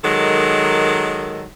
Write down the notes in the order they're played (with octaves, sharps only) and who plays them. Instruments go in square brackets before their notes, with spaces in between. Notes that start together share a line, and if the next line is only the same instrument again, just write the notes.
[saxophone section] D#3 F#3 G#3 A4 A#4